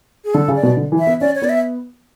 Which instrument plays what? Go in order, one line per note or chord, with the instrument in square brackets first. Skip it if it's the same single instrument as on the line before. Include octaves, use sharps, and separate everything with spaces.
[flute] G#4
[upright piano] D3 [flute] A4
[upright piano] C#3
[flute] D5
[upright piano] B2
D3
E3
[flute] E5
[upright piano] B3
[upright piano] C#4 [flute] D5
[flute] C#5
[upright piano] B3 [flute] D5
[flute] E5